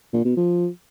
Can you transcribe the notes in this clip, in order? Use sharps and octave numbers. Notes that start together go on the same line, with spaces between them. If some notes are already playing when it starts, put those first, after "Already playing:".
A#2
B2
F3